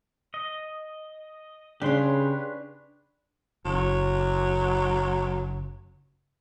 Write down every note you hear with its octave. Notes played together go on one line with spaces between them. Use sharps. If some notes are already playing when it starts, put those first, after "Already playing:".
D#5
C#3 D4 G4 B4 C#5 C6
F#1 F#3